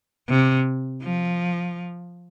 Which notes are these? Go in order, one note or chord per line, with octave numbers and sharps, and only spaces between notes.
C3
F3